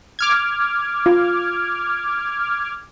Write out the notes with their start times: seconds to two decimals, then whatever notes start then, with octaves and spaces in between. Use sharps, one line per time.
0.19 D6 F6 G#6
1.06 F4